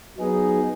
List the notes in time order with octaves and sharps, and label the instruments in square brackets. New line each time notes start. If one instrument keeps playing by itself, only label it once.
[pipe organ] F#3 B3 D#4 G#4